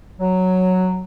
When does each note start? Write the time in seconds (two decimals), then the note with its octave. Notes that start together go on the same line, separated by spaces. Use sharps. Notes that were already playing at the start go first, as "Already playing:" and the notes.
0.20 F#3